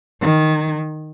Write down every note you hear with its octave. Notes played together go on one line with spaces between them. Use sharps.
D#3